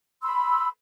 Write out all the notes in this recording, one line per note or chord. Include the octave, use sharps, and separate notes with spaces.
B5 C6 E6